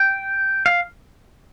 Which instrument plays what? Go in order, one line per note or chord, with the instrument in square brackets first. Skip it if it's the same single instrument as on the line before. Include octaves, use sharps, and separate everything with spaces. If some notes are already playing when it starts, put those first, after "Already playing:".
Already playing: [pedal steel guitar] G5
F5